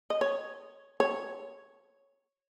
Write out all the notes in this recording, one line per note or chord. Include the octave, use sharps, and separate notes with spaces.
D#5
C#5
C#5